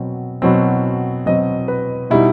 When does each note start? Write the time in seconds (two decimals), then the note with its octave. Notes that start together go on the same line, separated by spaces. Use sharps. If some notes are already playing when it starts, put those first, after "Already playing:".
Already playing: B2 F#3 C4
0.42 B2 F#3 C4
1.26 B2 F#3 C4 D#5
1.68 B4
2.10 B2 G3 D#4 E4